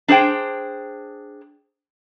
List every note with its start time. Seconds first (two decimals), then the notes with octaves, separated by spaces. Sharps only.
0.08 D4 G#4 C5 G5